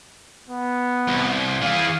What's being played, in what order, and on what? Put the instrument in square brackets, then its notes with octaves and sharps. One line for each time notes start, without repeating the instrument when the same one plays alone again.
[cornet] B3
[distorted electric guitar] C2
[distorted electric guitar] E3 G#4 [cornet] F5